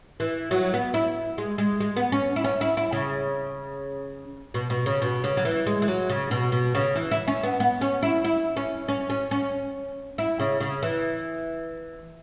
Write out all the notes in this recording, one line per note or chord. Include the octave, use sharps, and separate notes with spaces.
E3
F#3
B3
E4
G#3
G#3
G#3
B3
C#4
E4
C#4
E4
E4
C#3
B2
B2
C#3
B2
C#3
F#3
E3
G#3
E3
F#3
C#3
B2
B2
C#3
E3
E4
C#4
B3
B3
C#4
E4
E4
C#4
C#4
C#4
C#4
E4
C#3
C#3
E3